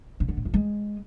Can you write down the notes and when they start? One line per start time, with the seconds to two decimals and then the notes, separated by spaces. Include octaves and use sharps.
0.20 C#3
0.29 D3
0.37 A2
0.45 F2
0.54 G#3